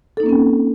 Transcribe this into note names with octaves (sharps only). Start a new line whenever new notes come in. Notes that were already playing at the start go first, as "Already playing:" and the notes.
A#3 C4 C#4 D#4 A4